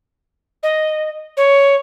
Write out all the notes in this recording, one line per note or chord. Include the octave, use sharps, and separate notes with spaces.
D#5
C#5